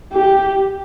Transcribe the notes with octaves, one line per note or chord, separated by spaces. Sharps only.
G4